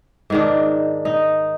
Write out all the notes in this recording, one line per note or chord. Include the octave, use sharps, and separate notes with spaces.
G#2 D#3 D4
D#4